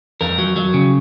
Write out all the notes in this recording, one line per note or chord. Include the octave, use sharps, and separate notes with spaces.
F2 A#4
F#3
F#3
C#3